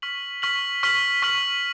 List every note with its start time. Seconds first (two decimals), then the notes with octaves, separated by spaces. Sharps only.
0.02 C#6 F6 B6 F#7
0.42 C#6 F6 B6 F#7
0.83 C#6 F6 B6 F#7
1.22 C#6 F6 B6 F#7